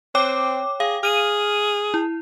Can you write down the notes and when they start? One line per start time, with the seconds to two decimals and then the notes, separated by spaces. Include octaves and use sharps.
0.15 C4 C#5 G5 D6
0.80 G#4 F5
1.03 G#4 F6 D#7
1.94 E4